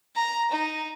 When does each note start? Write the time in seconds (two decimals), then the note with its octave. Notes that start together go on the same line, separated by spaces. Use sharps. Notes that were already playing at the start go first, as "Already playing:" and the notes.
0.15 A#5
0.51 D#4